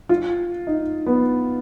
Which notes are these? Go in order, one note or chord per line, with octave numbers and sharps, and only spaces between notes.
F4
D#4
B3